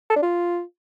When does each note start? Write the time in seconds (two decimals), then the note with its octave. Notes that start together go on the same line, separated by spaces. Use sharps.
0.10 A4
0.16 D4
0.22 F4